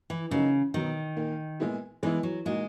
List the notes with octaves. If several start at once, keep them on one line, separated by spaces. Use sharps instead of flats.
E3
C#3 F#3 A#3 D#4 F#4
B2 D#3 F#3 B3
A#2 A#3 D#4
A#2 G#3 B3 E4
E3 G#3 B3 E4
F#3
A#2 G#3 A#3 D#4 F#4